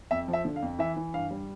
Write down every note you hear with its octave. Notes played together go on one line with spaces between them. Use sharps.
F2 E5
F3
E5
D3
F5
F2
E3 E5
E3
G2 F5
G3